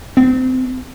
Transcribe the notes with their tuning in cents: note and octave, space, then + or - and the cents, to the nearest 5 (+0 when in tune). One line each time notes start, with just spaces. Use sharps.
C4 -30